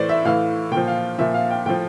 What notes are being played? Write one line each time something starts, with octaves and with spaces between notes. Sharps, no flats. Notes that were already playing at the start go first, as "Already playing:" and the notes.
Already playing: A2 E3 C5 D5
E5
A2 E3 F5
A#2 F3 G5
F5
A#2 F3 E5
F5
G5
A2 F3 G5